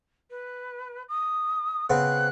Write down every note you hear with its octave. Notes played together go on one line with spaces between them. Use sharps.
B4
D#6
C#3 B3 C4 F#6